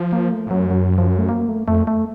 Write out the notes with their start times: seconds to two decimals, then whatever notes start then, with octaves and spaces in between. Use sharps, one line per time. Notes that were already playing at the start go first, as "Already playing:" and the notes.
Already playing: F3
0.13 A#3
0.31 A3
0.47 A2
0.51 F#2 F#3
0.71 F#3
0.98 F3
1.08 F#3
1.19 A3
1.29 A#3
1.49 A3
1.68 F2 A3
1.87 A3